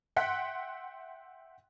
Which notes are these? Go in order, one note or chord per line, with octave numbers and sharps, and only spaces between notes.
E5 F#5 G5 C6 F#6 B6